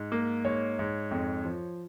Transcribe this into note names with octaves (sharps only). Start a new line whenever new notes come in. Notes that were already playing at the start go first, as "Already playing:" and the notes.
Already playing: G#2
A#3
G#2 C#5
G#2
F2
F3